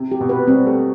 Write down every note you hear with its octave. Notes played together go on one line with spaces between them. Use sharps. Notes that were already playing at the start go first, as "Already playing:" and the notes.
Already playing: C3
G4
B2
B4
G3 C4
A3 G4